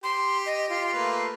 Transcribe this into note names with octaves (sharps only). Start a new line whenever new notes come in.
G4 C6
D#5
F4
A3 A#3 B4